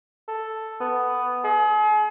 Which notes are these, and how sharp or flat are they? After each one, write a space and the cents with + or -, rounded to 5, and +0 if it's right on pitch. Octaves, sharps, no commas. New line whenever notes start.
A4 +5
B3 +5
G#4 +40